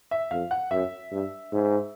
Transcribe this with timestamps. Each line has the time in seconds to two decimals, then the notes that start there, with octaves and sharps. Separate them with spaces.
0.11 E5
0.31 F2 F5
0.51 F#5
0.71 F#2 E5
1.12 G2
1.52 G#2